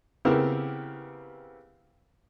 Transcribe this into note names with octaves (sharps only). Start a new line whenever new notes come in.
C#3 B3 C4 E4 G4 A#4